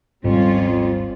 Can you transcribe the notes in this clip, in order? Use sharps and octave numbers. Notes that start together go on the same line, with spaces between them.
D#1 G#1 F2 G#2 G3 C#4 F4